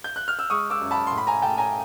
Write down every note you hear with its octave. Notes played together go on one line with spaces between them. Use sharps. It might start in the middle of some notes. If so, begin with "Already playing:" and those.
G6
F#6
F6
E6
G#3 C#6 D#6
D6 E6
F#2
A5 B5
A2 C6
B5
G#5 A#5
A2 G5 A5
G#5 A#5